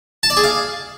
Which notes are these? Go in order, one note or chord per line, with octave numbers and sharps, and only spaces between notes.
A5
D5
G#4
F5